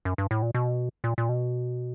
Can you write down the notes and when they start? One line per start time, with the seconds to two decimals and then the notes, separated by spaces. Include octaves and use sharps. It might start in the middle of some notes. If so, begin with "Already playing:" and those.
0.05 F#2
0.18 G2
0.31 A2
0.42 A#2
0.55 B2
1.04 A#2
1.18 A#2
1.29 B2